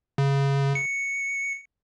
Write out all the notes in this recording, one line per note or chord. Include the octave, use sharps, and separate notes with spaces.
C#3
C#7